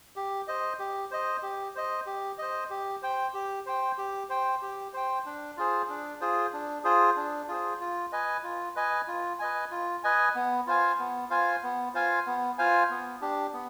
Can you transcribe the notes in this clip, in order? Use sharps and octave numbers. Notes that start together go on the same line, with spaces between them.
G4
C5 D#5
G4
C5 D#5
G4
C5 D#5
G4
C5 D#5
G4
C5 G5
G4
C5 G5
G4
C5 G5
G4
C5 G5
D4
F4 G#4 C5
D4
F4 G#4 C5
D4
F4 G#4 C5
D4
F4 G#4 C5
F4
B4 D#5 G#5
F4
B4 D#5 G#5
F4
B4 D#5 G#5
F4
B4 D#5 G#5
B3
F4 C5 F5 G#5
B3
F4 C5 F5 G#5
B3
F4 C5 F5 G#5
B3
F4 C5 F5 G#5
B3
D4 G4
B3